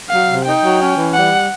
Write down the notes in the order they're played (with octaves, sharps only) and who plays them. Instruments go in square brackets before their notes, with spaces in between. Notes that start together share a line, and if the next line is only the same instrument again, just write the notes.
[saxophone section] F#3 [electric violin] F5
[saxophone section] C3
[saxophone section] D#4 [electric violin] G5
[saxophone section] F#3
C#4
E3
[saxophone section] G3 [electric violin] F#5